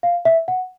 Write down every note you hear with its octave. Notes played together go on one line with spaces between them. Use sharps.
F5
E5
F#5